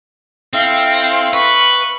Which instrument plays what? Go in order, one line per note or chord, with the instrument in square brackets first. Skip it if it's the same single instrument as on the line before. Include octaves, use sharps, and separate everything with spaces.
[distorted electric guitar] C4 [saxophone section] E4 A4 F5
[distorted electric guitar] B4 [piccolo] C#6